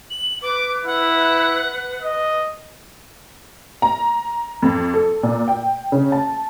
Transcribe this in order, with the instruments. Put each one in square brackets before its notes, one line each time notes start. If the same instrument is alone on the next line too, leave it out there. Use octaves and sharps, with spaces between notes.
[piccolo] F#7
[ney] B4 [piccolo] D6
[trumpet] E4 [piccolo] F#5
[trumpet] D#5
[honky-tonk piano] A#5
F2
A4
A#2
G5
C#3
A5